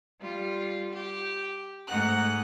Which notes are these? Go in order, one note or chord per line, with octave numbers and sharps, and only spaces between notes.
G3 F4
G4
G#2 A3 D#4 F#5 F#6